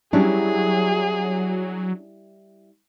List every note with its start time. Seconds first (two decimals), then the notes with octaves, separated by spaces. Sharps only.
0.13 F#3 G3 C#4 D4 E4 G#4